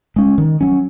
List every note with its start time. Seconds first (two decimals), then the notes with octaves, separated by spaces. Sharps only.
0.16 G#3 C#4
0.38 D#3
0.61 F#3 C#4